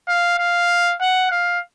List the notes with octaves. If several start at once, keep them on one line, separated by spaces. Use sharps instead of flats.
F5
F5
F#5
F5